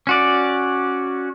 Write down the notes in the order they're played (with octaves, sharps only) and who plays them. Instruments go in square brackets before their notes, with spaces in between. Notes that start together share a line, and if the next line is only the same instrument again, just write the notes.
[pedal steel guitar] C#4 F#4 D5